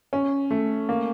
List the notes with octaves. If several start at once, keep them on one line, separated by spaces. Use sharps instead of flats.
C#4
A3
A#3